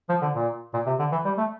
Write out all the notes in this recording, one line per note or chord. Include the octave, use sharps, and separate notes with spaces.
F3
D3
A#2
A#2
C3
D3
E3
G3
A3